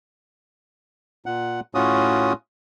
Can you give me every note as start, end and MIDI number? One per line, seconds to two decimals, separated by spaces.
1.26 1.60 46
1.26 1.60 78
1.75 2.33 45
1.75 2.33 61
1.75 2.33 65
1.75 2.33 66
1.75 2.33 87